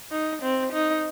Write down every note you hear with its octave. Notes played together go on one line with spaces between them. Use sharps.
D#4
C4
D#4